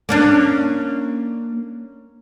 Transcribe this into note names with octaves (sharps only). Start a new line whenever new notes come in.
A#3 C#4 D4